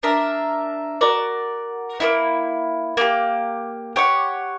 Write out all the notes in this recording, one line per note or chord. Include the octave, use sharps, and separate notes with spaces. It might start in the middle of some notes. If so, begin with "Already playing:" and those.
D4 A#4 E5
F#4 A#4 D5
A#3 C#4 E4
A#3 E4 G4
G4 C#5 F#5